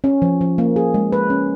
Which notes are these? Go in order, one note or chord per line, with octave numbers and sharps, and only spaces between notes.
C#4
F3
F3
A#3
G#4
G#3
B4
C#4